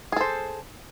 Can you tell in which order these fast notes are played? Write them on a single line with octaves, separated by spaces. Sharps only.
G#4 A4 C5